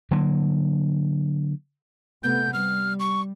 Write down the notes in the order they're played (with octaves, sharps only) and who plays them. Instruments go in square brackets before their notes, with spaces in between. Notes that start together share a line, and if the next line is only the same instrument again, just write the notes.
[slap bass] D3 F#3 A#3
[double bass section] C3 A3 B3 [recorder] G6
[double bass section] G3 [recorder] F6
[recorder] C#6